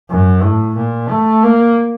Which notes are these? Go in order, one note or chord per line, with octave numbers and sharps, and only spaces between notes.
F#2
A2
A#2
A3
A#3